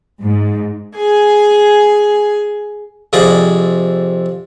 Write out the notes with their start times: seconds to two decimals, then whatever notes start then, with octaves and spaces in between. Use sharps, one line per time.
0.21 G#2
0.96 G#4 G#5
3.13 F2 C3 G#4 D5 D6